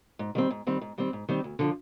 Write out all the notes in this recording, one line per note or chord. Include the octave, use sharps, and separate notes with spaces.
G#2
D#3 G3 C4
G#2
D#3 G3 C4
G#2
D#3 G3 C4
G#2
D#3 G3 C4
D2
D3 F3